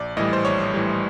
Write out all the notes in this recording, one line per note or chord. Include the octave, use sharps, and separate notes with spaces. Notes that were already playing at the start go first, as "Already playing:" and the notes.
Already playing: A#1 D5
A2 E3 G3 D#5
C5
A#1 C#5
A2 E3 G3